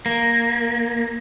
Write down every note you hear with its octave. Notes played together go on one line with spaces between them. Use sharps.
A#3